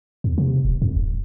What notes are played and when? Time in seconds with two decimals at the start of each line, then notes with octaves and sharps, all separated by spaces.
0.24 E2
0.38 C3
0.65 D#1
0.82 F2
0.96 D1